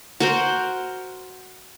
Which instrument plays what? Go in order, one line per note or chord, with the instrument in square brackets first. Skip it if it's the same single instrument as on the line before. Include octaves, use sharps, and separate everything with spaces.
[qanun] F#4 A#4 C5